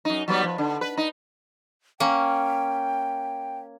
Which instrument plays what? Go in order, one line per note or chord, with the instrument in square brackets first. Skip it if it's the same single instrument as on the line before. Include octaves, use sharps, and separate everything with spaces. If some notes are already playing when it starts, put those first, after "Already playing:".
[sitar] F#2 D#4
F#3 G3 B3
F3
D3
B4
D#4
[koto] A#3 C#4 [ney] G5